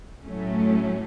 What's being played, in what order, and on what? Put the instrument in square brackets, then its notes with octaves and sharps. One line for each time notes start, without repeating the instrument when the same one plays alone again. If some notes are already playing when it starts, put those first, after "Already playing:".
[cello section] A2 F#3 A3 C#4